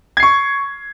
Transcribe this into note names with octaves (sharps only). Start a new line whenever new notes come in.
C#6 G#6 C7